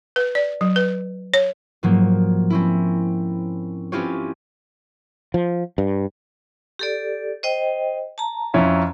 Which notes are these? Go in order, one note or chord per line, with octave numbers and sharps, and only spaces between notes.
B4
D5
F#3
B4
C#5
G#2 F3 F#3 A#3
C4 C#4 E4
C4 C#4 E4 F4 G4 C#5
F3
G2
G4 A4 D5
C5 D#5 G5
A5 A#5
F2 C#4 E4